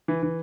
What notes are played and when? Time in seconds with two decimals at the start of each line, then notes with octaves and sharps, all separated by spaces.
0.08 E3
0.23 E3